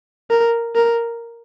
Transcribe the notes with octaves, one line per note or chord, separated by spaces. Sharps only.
A#4
A#4